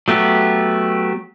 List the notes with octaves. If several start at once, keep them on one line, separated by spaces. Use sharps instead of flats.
F#3 A3 B3 G4